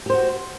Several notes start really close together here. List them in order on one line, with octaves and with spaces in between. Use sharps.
G4 C5 F#4